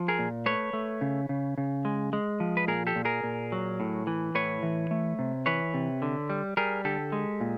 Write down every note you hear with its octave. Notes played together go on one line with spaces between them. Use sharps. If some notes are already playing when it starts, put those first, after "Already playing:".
Already playing: F3
G#4 A#4
A#2
A3 B4 C#5
A3
C#3
C#3
C#3
G#3
G#3
F3
B4
A#2 G#4 A#4
G4 A4
A#2
G#4 A#4
A#2
F#3
A2
E3
A2 B4 C#5
E3
A3
C3
E3 B4 C#5
C3
D3
G3
G3 G#4 A#4
D3 G4 A4
G#3
A#2